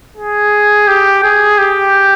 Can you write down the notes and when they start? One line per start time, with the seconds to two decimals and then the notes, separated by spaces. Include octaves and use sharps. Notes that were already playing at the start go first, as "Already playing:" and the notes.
0.17 G#4
0.88 G4
1.23 G#4
1.58 G4